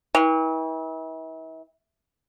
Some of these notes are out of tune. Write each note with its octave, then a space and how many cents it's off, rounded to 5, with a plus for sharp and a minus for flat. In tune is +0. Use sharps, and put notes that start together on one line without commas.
E3 -40